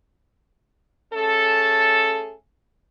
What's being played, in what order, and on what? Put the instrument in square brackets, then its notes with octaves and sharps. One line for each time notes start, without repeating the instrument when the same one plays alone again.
[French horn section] A3 C#4 G#4 A4